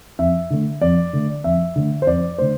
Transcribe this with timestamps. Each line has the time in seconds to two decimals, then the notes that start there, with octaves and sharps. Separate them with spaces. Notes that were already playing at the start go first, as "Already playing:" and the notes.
0.19 F2 E5
0.50 D3 A3
0.81 F2 D5
1.13 D3 A3
1.44 F2 E5
1.76 D3 A3
2.02 C5
2.07 F2 D5
2.38 D3 A3 C5